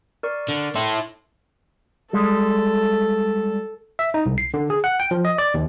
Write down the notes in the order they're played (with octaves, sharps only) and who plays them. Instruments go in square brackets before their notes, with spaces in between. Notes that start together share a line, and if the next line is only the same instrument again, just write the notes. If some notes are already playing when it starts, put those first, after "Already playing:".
[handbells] A#4 D5 C#6
[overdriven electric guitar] D3
[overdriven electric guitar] E4 A4 [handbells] C6
[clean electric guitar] G3 G#3 [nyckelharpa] A4
[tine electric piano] E5
D#4
C2
C7
D3
G#4
F#5
G5
F3
D#5
D5
D#2